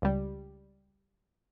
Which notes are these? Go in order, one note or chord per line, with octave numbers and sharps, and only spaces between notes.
C#2 G3